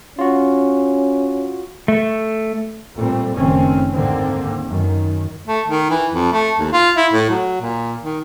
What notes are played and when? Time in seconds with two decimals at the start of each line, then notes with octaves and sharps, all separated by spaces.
0.19 C#4 F4 F#4
1.88 A3
2.95 A#2 G3 A3 C4
3.36 F#1 D#3 A3 C4 C#4
3.95 D#2 G#2 D3 A#3 C4
4.67 F#2 D#3
5.48 A3
5.68 D#3
5.90 E3
6.12 F2
6.33 A3
6.59 D#2
6.73 F4
6.97 E4
7.13 A2
7.30 F#3
7.62 A#2
8.03 D#3